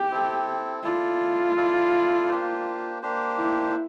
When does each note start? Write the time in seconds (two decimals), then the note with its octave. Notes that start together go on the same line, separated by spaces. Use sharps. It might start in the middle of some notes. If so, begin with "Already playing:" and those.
Already playing: G4
0.11 C4 E4 A4
0.84 E4 F4 A4 D5
1.57 E4 A4 D5
2.29 A#3 D4 G4 C5
3.02 A#3 D4 G4 C5
3.39 E4